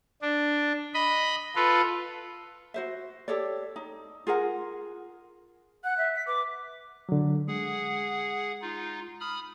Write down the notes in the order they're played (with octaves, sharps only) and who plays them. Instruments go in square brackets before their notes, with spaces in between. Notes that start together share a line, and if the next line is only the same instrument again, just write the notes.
[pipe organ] D4
D#5 B5
F4 A4 B4
[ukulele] F#4 C5 E5
G4 A4 C#5 D5
D#4
F4 G#4 A#4 F#5
[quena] F#5 [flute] F#6
[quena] E5
[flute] B6
[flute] B4 [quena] D6
[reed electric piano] D3 F#3
[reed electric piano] G#3 [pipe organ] G#4 F#5
[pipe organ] D#4 F4
B5 D#6 F6